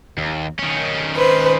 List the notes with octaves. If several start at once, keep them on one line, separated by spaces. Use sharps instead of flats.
D#2
D#3 C#4
B4 C5